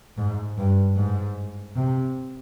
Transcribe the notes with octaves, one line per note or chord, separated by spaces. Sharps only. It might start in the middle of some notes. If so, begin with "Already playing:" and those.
G#2
G2
G#2
C3